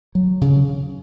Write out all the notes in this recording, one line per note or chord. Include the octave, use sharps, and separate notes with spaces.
F#3
C#3